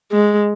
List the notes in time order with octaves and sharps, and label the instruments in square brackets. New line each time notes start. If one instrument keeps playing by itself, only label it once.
[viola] G#3